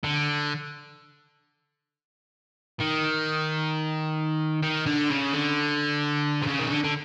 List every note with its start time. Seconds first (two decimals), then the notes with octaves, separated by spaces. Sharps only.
0.04 D3
2.80 D#3
4.63 D#3
4.86 D3
5.09 C#3
5.32 D3
6.42 C3
6.47 C#3
6.59 D#3
6.70 D3
6.84 D3